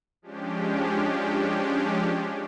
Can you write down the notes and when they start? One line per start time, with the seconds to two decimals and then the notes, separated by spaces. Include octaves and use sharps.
0.22 F3 G#3 C#4 D4 G4